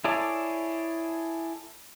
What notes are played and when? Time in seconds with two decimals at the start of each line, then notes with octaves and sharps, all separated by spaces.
0.04 E4 G#4 A4 C#5 D5